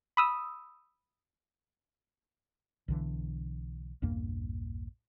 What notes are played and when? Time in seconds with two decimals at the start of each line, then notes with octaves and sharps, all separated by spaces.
0.17 B5 D#6 E6
2.88 B1 D3 E3
4.02 A#1 E2 G2 A#3